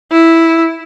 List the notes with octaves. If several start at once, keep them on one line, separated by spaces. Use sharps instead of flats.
E4